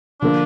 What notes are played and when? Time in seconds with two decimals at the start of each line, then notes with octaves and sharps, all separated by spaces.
0.21 D3 F3 A#3 D4